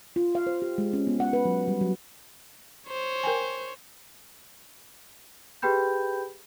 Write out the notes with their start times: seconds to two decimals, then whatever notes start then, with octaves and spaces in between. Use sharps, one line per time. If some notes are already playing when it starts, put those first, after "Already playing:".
0.16 F4
0.35 F5
0.47 C5
0.62 G4
0.78 G#3
0.93 C#4
1.07 B3
1.20 F#5
1.33 B4
1.45 F#3
1.68 G3
1.81 F#3
2.88 C5 C#5
3.23 A#4 G5 G#5
5.62 G4 G#4 B4 G5 B5 G6